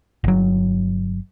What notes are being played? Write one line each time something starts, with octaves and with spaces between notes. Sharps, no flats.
G1 F#3